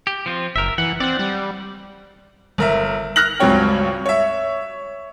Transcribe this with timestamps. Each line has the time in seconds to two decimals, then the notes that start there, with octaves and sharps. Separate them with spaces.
0.07 G4
0.26 F3 C4 F4
0.56 F#1 A#4 E5
0.78 E3 F#5
1.00 C4 D5 F#5
1.19 G3
2.58 G1 A#4 E5
3.16 F6 F#6 A#6 F#7
3.40 C#2 G2 F#3 C4 C#5 G5
4.06 C#5 E5